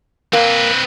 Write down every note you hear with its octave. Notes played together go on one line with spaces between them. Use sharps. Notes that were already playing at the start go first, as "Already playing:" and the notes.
A#3 C4 B4